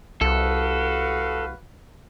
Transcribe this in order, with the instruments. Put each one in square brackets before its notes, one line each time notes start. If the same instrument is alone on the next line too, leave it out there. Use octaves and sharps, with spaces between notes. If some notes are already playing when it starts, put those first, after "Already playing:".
[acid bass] C2 [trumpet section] F#4 B4 F5 [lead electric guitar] A4